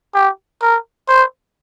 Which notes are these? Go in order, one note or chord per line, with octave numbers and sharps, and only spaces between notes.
G4
A#4
C5